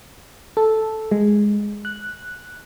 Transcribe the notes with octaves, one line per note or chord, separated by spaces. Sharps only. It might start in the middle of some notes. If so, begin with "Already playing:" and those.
A4
G#3
F#6